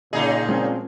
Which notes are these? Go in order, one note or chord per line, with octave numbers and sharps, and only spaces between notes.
A#2 C#3 D#4 G#4 D#5
F3 G#3 C4 C#4